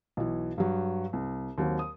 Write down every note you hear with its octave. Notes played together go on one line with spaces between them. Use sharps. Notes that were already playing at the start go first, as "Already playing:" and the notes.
B1 E3
G2 F#3
C2
D#2 F#3 C4
D#6